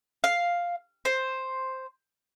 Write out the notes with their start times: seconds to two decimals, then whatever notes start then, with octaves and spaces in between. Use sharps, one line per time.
0.24 F5
1.05 C5